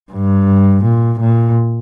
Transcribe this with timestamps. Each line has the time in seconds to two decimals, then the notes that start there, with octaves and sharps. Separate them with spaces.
0.12 G2
0.84 A#2
1.20 A#2